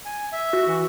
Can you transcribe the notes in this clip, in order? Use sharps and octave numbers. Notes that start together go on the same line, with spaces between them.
G#5
E5
F#4
E3